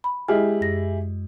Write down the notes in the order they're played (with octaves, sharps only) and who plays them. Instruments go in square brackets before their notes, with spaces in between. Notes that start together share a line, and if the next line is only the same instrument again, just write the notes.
[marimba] B5
[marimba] G#3 D#5 F6 [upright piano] E4 G4 G#4
[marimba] F#2 A#6